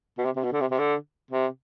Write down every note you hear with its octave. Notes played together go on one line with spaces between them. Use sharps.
B2
C3
C3
B2
D3
C3
C3
D3
C3